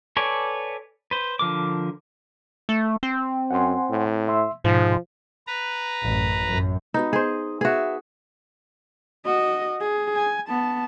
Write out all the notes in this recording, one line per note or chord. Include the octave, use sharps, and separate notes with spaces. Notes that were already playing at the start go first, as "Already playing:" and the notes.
A4 B4 C#5 D5 G#5
B4 C5
D3 F3 A#4 D6
A3
C4
F#2 F#5 G#5 C6
A2
E5 C6 E6
G#2 B2 F3
B4 A#5
A1 F#2
F#2
G#3 B3 D#4 F#4
G#4 C5 D#5
B3 F#4 G#4 E5
F#4 D#5
G#4
G#5
B3 A5